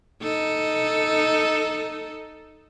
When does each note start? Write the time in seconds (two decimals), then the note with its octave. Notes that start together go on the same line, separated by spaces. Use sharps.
0.23 D#4 A4